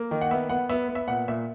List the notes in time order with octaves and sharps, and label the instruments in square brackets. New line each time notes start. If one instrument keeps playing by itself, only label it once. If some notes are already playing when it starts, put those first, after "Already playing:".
Already playing: [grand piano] A#3
D#3
F#5
B3 E5
B3 F#5
B3 E5
B3
E5
A#2 F#5
A#2 E5